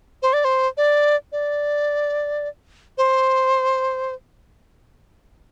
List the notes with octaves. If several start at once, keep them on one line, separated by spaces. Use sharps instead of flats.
C5
D5
C5
D5
D5
C5